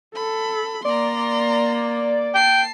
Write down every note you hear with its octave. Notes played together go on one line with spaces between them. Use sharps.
A4 B5
A#3 D5 A#5 C6
G5 A5 C7